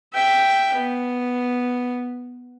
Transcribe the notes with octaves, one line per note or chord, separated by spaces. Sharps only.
E5 G5
B3